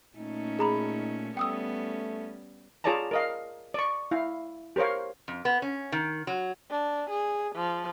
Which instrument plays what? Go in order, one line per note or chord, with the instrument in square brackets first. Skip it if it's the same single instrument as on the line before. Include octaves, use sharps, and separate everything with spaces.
[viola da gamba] A#2 A3 C#4 [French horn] D#4
[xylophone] G#4 A#5 B5
[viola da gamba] G3 B3 C#4 [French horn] A3 [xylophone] G5 D#6 E6
[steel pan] F4 G#4 C#5 D5 A5 A#5
A#4 D#5 F5
D5 C#6
E4 F5
G4 A#4 C5 C#5 F5
[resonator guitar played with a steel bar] F2
B3
C#4
D#3
F#3
[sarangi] D4
G#4
F3